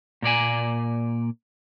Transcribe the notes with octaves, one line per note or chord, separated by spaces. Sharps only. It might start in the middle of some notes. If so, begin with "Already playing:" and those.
A#2 A#3 D5 G#5